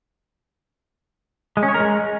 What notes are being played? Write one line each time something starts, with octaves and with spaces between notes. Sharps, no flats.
G#3
C#4
C#5
A#4
G#3